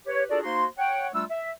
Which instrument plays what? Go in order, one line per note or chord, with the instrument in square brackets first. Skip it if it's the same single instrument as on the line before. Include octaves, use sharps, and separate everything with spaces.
[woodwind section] G4 B4 C#5
D4 F4 F#4 G#4 A4 D5
A#3 D#4 F#4 C5 C6
C#5 F#5 G5
G3 A3 D4 F4 E6
E5